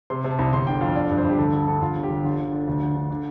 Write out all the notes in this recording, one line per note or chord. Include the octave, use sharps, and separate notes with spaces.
C3 C6
C3
A5
C2
G1 C6
D3 G5
F2 F5
D3 D5
G2
C5
G2
G4
D2 A4
D3 A4
D3 A4
G2 F4
G1
G4
G1
D3 F4
D3
D3
D2
D3
D3
D3